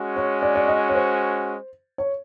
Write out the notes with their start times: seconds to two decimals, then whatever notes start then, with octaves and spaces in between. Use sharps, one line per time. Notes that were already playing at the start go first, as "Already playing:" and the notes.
Already playing: G#3 C#4 F#4
0.17 C#5
0.42 D5
0.55 D5
0.68 D#5
0.89 C#5
0.95 C5
1.98 C#5